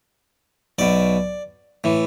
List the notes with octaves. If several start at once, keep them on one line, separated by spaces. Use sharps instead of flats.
B1 B2 D5
A2 E3